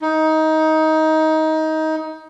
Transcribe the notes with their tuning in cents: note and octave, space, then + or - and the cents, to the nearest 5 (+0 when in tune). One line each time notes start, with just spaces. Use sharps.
D#4 +20